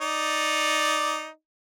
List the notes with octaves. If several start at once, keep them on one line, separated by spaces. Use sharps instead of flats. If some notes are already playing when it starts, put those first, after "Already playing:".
D#4 D5